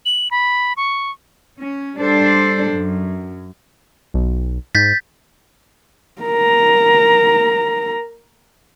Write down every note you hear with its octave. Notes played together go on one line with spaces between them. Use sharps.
F#7
B5
C#6
C#4
G3 D4 A4 C5
F#2
B1
G#2 G6 A6 B6
A#4 A#5